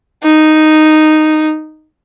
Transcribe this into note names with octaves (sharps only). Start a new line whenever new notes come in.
D#4